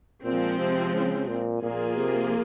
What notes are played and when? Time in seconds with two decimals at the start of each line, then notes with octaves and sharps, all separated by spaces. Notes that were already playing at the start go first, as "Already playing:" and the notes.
0.24 A#2 F3 G#3 C4
0.58 C3
0.94 C#3
1.29 A#2
1.62 A#2 F3 A#3 F4 G#4
1.98 C3